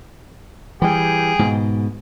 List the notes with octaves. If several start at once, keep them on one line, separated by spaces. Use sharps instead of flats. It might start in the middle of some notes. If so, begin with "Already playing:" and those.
E3 G3 G#4 G5
G#2 B2